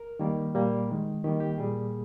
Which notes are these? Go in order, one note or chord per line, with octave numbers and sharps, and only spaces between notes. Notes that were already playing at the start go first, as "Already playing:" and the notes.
Already playing: A#4
D#3 G3 A#3
A#2 G3 A#3
D#3 G#3
D#3 G3 A#3 G4
G4
A#2 G3 A#3 G#4